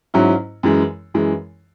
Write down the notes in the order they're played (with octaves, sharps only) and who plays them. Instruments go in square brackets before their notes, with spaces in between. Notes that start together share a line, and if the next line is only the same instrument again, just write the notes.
[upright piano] G#2 F#3 C#4 E4
F#2 E3 G#3
F#2 E3 G#3